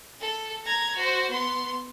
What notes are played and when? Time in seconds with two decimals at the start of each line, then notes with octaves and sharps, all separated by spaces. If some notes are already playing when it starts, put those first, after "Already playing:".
0.21 A4
0.65 A#5 G#6
0.96 F#4 C5
1.30 B3 C6